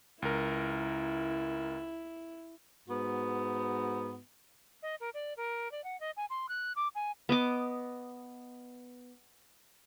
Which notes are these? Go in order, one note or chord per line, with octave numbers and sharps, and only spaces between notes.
C#2 E4 A#4
G#2 B3 F#4
D#5
A#4
D5
A#4
D5
F#5
D#5
G#5
C6
F#6
D6
G#5
B3 D#5 D6